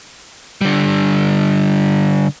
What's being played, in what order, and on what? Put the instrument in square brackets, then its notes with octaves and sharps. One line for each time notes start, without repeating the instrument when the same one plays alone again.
[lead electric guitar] D3 G3